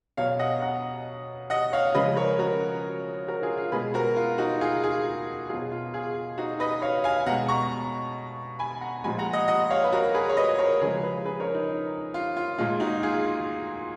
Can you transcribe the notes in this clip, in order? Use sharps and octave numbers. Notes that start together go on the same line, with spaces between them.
B2 F#3 C#5 F5
D#5 F#5
F#5 A#5
D#5 F#5
C#5 F5
C#3 F3 G#3 B4 D#5
A#4 C#5
F#4 A#4
F#4 A#4
F4 G#4
F4
B2 G#3 G#4 B4
F#4 A#4
F4
D#4 F#4
F4 G#4
F4 G#4
B2 F#3 F4 G#4
F4
F4 G#4
D#4 F#4
B4 D#5
C#5 F5
F5 G#5
B2 G#3 F#5 A#5
A#5 C#6
G#5 B5
F#5 A#5
A#2 F3 G#3 G#5 B5
F#5 A#5
D#5 F#5
D#5 F#5
C#5 F5
B4
F#4 A#4
G#4 B4
C#5
B4 D#5
A#4 C#5
C#3 F3 G#3 G#4 B4
G#4 B4
G#4 B4
A#4 C#5
D#4
F4
F4
A#2 G#3 F4
D#4 F#4
F4 G#4
F4